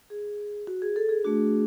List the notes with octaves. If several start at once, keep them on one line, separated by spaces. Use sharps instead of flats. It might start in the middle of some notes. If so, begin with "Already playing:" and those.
G#4
F#4
G#4
A4
G#4
A3 D4 F#4